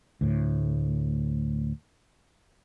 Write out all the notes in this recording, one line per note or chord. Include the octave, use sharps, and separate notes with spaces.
D2 A2